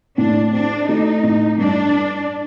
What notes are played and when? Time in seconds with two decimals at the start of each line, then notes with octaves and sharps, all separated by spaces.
0.18 A2 D4
0.53 C4 D4
0.88 A3 D#4
1.23 A2
1.58 G2 D4